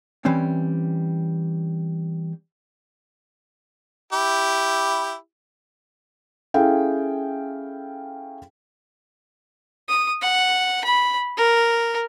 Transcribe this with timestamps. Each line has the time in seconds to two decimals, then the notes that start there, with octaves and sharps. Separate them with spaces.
0.25 E3 G3 C4 C#4
4.13 E4 G4
6.54 C#4 E4 G#4 A4 F5 G5
9.88 D#6
10.22 F#5
10.84 B5
11.37 A#4